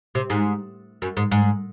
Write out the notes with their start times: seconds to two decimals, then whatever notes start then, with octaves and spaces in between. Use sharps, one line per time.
0.15 C3
0.30 G#2
1.02 F#2
1.17 G#2
1.31 G#2